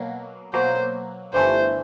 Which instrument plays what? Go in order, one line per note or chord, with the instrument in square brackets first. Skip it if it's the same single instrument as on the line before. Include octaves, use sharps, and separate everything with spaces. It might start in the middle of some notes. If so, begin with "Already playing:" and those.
Already playing: [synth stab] B2 F#3 A#3
[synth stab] B2 F#3 A#3 [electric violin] C5
[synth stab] G1 G2 E3 A3 [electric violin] C5